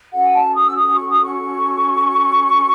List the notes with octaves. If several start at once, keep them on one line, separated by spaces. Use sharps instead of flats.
C#4 F#4 A4 F#5
G#5
A5
D#6
E6
D#6
C#6
D#6
C#6